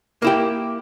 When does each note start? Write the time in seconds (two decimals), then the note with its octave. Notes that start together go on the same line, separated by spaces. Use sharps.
0.22 A#3 E4 G4